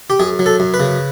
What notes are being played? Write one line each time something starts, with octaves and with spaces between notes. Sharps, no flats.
G4
F#2 G#4
F#3
A4
F#2
B4
C#3